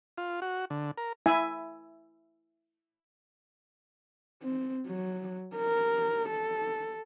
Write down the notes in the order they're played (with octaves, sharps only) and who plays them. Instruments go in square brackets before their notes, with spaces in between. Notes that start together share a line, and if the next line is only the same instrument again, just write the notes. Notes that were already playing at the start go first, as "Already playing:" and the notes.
[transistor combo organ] F4
F#4
D3
A#4
[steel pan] E4 E5 G#5
[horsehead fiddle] C4
F#3
A#4
A4